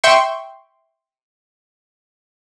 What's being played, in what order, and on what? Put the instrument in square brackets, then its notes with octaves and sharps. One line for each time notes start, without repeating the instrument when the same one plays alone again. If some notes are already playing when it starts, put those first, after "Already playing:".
[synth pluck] E5 G5 C6 C#6